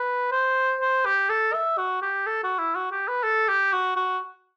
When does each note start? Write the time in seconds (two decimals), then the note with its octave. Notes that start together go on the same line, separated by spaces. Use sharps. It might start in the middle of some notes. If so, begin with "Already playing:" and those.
Already playing: B4
0.32 C5
0.81 C5
1.05 G4
1.29 A4
1.53 E5
1.78 F#4
2.02 G4
2.26 A4
2.43 F#4
2.58 E4
2.75 F#4
2.91 G4
3.08 B4
3.23 A4
3.48 G4
3.73 F#4
3.96 F#4